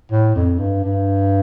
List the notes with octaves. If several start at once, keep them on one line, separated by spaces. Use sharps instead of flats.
A2
F2
G2
G2